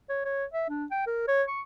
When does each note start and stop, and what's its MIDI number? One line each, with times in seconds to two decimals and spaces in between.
0.09 0.21 73
0.25 0.45 73
0.53 0.65 76
0.69 0.85 62
0.91 1.05 79
1.07 1.27 70
1.28 1.43 73
1.48 1.61 85